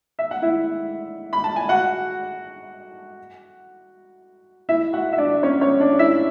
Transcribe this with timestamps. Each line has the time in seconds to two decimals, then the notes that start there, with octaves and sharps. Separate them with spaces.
0.19 E5
0.31 F#5
0.42 E4 E5
1.33 B5
1.44 A5
1.56 G#5
1.69 F#4 F#5
4.69 E4 E5
4.93 F#4 F#5
5.13 E5
5.18 D4 D5
5.43 C#4 C#5
5.61 C#4 C#5
5.80 D4 D5
5.99 E4 E5